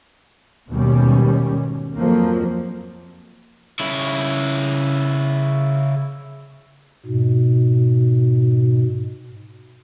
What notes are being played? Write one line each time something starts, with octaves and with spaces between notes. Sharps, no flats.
D#2 G#2 B2 G3 C#4
F2 F3 F#3 A#3
C#3 E4
G#2 B2